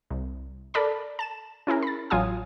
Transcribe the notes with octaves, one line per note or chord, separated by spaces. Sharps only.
C2
A4 A#4 D5 A5 B5
A5 E7
C#4 E4 G#4 A#4
B5 A6
A1 F#3 F4 G#5 D#6